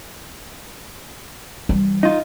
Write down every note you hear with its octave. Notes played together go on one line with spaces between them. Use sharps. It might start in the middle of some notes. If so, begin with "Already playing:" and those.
E3 G3
D#4 F4